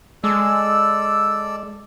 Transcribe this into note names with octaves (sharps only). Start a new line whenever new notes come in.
G#3 A4 D5 E6